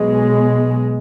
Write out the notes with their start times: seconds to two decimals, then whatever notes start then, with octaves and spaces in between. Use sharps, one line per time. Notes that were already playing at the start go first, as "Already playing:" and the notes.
Already playing: B1 B2 G#3